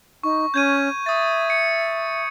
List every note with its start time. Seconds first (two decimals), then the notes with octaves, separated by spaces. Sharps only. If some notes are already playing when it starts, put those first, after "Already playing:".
0.23 D#4 C#6
0.54 C#4 G6 G#6 D#7
1.06 E5 D#6 A6
1.50 C#7